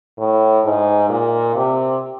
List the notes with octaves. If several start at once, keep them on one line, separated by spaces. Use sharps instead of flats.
A2
G#2
A#2
C3